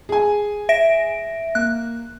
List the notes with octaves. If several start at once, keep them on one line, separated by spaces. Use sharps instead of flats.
G#4 G#5
E5 A#6 D7
A#3 F#6